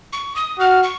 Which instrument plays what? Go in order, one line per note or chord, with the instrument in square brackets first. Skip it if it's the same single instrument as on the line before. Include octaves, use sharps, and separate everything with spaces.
[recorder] C#6
D#6
[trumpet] F#4 [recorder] F6
[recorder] C#6